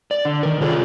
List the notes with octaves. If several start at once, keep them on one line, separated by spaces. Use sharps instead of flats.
D5
D3
D#3 A#4
C3 F4 G#4 A4 C#5 D5